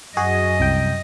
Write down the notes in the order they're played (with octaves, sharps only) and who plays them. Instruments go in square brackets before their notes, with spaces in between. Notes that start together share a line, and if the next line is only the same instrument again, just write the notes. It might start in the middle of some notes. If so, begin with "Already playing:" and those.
[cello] F#2 D#5 [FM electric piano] F#4 G#4
[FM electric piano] C2 G5